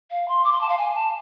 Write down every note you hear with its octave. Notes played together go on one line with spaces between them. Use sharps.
F5
C6
D6
C6
A5
F5
G#5
A5